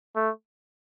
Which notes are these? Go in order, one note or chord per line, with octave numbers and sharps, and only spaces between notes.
A3